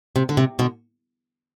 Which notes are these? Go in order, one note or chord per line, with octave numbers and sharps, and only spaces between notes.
C3
D3
C3
B2 D3